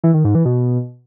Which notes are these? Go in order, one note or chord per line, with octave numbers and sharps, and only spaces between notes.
E3
D#3
G#2
E3
B2